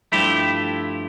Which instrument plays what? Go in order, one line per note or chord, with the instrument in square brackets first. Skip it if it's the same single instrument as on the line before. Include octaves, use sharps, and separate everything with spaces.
[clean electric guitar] G2 F3 A3 E4 G4